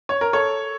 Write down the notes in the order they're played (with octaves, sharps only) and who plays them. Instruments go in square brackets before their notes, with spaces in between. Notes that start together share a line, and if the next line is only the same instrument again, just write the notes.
[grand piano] C#5
A#4
A4 C#5